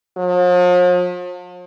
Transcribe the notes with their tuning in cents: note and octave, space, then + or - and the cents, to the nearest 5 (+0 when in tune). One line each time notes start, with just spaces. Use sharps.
F3 +45